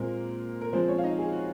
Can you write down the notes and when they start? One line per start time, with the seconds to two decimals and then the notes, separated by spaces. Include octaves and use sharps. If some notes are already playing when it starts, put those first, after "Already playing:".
Already playing: A#2 G#3 A#3 C4 A#4
0.61 A#4
0.73 F3 G#3 C4 C5
0.88 C#4 C#5
0.98 F5
1.04 D#4 D#5
1.19 G#4
1.32 F#4